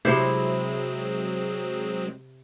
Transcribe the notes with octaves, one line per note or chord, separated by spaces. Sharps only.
C3 F#3 G#3 C4 E4 C5